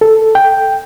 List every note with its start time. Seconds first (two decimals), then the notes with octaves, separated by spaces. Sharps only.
0.01 A4
0.35 G5